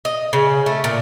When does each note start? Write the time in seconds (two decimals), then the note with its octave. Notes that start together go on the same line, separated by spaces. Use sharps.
0.05 D#5
0.33 C#3
0.66 A3
0.84 A#2